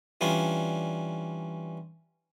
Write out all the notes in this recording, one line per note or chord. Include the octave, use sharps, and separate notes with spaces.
E3 G3 C#4 D4 F4